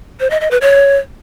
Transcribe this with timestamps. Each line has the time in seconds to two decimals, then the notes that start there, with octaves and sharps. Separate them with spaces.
0.20 C5
0.30 D#5
0.41 D#5
0.51 B4
0.61 C#5